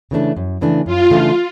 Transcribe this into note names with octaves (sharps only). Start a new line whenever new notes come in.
C#3 E3 A3 D4
F#2
C#3 E3 A3 D4
F#2 F4
C#3 E3 A3 D4